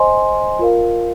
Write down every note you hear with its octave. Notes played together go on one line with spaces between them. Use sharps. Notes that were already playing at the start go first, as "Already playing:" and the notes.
Already playing: C5 D#5 G#5 C6
F4 A#4 F5